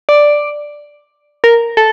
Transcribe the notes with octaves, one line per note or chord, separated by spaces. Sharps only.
D5
A#4
A4